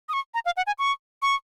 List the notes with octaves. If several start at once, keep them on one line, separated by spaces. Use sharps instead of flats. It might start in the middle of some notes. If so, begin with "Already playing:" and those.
D#6
C#6
A#5
F5
F#5
G#5
C#6
C#6